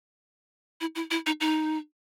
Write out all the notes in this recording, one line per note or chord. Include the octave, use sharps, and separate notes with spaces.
E4
E4
E4
D#4
D#4